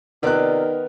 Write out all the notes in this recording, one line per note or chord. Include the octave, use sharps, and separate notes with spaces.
C3 D#3 B3 F4 A#4 D5 F#6